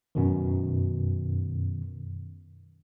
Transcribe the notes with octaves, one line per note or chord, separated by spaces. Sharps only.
F#2 B2 D#3